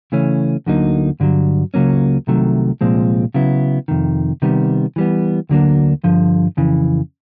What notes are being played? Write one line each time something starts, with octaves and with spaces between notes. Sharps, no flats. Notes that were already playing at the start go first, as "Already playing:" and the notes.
C#3 E3 A3 C#4
D2 D3 F#3 A#3 D#4
G2 D3 F#3
C#2 C#3 F#3 A#3 C#4
C2 C3 D#3 F#3 A3
C2 A#2 F3 G#3 C4
C#3 F#3 B3 E4
F2 C3 D#3
C3 D#3 G3 B3
E3 G3 B3
D2 D3 F#3 A#3 D4
G2 D3 F3
F2 C#3 E3